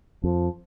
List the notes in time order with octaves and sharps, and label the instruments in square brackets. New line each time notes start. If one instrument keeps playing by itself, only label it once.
[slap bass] F2 [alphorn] F3